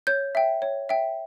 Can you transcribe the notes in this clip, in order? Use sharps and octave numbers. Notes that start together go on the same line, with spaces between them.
C#5 G6
E5 G5
C#5
E5 G5